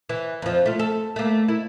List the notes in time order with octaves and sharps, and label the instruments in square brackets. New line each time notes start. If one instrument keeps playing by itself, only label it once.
[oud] E3
F2 F3
A3 F4
A4
A3 A#3
E4